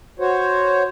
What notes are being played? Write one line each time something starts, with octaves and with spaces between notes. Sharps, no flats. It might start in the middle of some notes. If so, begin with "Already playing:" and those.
F#4 C5 C#5